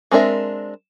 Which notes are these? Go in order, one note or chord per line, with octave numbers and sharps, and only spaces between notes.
G#3 C4 D4 A#4 E5